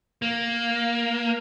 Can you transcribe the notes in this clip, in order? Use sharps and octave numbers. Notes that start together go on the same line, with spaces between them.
A#3